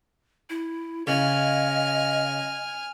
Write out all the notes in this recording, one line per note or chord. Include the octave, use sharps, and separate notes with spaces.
E4
C#3 D#5 F5 G#5 F6